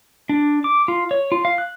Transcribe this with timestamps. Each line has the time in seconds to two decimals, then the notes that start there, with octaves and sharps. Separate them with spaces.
0.29 D4
0.64 D6
0.88 F4
1.11 C#5
1.32 F4
1.45 F5
1.58 F#6